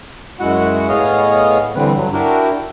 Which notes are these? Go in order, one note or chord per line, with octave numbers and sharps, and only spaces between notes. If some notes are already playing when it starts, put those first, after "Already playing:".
F#2 G#3 E4 F#4 F#5
A2 B3 G#4 C#5 D#5 F5
D3 E3 G3 C4 B4
G2 F#3
D4 E4 F#4 G4 A#4